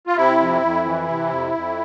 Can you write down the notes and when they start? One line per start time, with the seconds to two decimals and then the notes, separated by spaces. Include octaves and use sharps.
0.07 F4
0.16 C3 E4
0.39 F2
0.62 F2
0.85 E3
1.08 C3
1.31 F2
1.54 F2